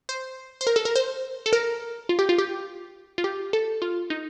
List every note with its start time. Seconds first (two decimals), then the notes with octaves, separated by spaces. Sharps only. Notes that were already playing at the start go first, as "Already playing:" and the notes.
0.09 C5
0.61 C5
0.67 A#4
0.76 A4
0.85 A#4
0.96 C5
1.46 A4
1.53 A#4
2.09 F4
2.19 G4
2.29 F4
2.38 G4
3.18 F4
3.24 G4
3.53 A4
3.82 F4
4.10 D#4